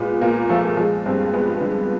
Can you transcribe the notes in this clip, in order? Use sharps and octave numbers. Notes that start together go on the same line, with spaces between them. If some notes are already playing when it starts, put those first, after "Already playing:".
Already playing: A#2 G#3 B3
A#2 A#3
F3 A3
A3
F3 G#3
G2 C4
G#3 B3
D3